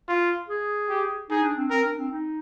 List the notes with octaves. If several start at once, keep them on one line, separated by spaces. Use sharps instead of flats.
F4
G#4
G4
D#4 G#4
D4
C4
C4 A#4
D4
C4
D#4